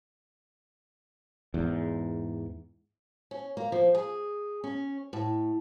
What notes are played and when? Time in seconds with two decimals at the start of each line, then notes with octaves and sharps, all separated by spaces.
1.54 E2 G#2
3.31 C#4
3.57 A#3
3.72 F3
3.95 G#4
4.64 C#4
5.13 A2